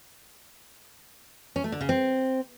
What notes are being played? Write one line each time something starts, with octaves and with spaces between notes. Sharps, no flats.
C#4
A3
D3
C#3
C4